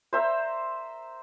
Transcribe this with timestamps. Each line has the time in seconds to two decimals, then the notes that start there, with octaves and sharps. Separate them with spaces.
0.13 C5 E5 A#5